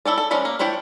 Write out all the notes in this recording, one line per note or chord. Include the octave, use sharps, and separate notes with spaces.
E4 A4 C#5 D5
A4
F3 G#3 C#4 D5 B5
A#3
F3 D4 E4 C#5 G5